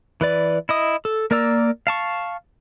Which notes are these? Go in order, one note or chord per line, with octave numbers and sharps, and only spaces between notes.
E3 B4 D5
E4 D#5 D#6
A4
A#3 A#4 D5 A#5 E6
F5 A5 C#6